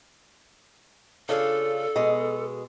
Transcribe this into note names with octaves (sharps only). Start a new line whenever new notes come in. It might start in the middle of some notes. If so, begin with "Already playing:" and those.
C#3 D4 F4 A4
B2 G#3